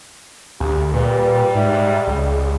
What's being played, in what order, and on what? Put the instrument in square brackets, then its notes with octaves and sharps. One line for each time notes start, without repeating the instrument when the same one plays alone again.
[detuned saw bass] D2 [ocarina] G4
[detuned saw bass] A#2 [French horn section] G3 [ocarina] B4
[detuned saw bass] G#2 [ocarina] E5
[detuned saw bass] C#2 [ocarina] G#4